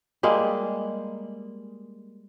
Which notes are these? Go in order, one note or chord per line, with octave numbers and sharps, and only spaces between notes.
G3 G#3 A#3